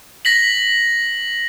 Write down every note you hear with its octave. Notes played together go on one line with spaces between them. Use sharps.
A#6 B6 F#7